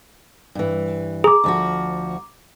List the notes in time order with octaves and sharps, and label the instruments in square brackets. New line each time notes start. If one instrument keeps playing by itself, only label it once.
[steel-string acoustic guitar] G2 E3
[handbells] G#4 [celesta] A#5 D6
[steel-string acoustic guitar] D2 F3 F#4